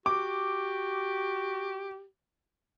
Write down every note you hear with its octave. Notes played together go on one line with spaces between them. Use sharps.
F#4 G4 D6